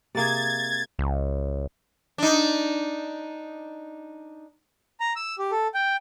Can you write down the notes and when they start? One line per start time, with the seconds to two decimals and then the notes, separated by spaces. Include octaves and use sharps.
0.15 C3 A#3 G#4 G#6 A6
0.99 C#2
2.18 D4 D#4
5.00 A#5
5.16 E6
5.39 G4
5.51 A4
5.74 G5